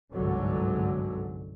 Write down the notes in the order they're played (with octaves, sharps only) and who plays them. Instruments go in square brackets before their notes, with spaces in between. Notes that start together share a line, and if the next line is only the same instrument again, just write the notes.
[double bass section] G1 C2 G#2 D3 F#3